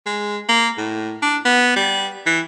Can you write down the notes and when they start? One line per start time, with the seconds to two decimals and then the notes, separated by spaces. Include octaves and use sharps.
0.06 G#3
0.49 A#3
0.78 A2
1.22 D4
1.45 B3
1.76 G3
2.26 E3